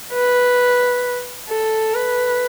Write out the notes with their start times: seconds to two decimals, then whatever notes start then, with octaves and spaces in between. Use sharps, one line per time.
0.13 B4
1.49 A4
1.94 B4